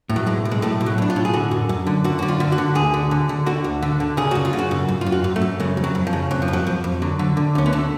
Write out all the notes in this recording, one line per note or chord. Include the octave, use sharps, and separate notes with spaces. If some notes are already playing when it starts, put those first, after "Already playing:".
A2
F#3
B1 G#3
B1
G#3
A2 A3
B1
F#3
A2 D4
F4
A2
G#4
D3 F#4
F#2
F#2
D3
F#2 F#4
D3 F#4
F4
D3
F#4
D3
D2 G#4
D3
D3
D3
D3 F#4
D2
D3
D3
C#3 G#4
F#2 F#4
F4
C#3
F#4
F#2
F#2
F4
F#2
F#4
F#2
A3
F#2
C#3 G#3
F2
F#3
F2
F3
C#3
F2 F#3
F3
F2
F#3
F2 F3
F2
D3 F#3
D3
D3
D2 C#4
B3
D3 A3